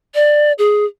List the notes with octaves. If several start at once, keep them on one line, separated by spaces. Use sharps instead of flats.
D5
G#4